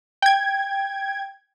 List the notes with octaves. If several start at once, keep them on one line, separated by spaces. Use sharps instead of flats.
G5 G#6